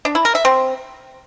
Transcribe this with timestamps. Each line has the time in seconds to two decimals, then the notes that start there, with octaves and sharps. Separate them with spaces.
0.05 D4
0.15 E4
0.25 A#4
0.35 E5
0.45 C4